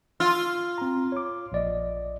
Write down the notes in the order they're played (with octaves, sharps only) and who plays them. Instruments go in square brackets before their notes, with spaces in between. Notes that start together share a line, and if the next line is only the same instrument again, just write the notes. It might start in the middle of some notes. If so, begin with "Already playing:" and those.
[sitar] F4 [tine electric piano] E6
[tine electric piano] C4 A#5
C#5 D6
A#1 D5 D#5